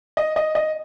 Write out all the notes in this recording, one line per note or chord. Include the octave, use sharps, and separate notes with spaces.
D#5
D#5
D#5